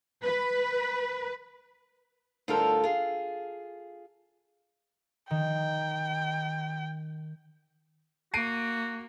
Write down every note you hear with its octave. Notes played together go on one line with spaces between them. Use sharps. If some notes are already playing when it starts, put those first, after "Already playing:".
B4
D2 A2 G3 F4 A4 A#4
F4 G#4
D#3 G5
A#3 F#4 C7 D7 D#7